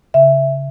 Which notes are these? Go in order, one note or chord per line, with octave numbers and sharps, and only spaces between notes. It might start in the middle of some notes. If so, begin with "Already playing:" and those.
C#3 E5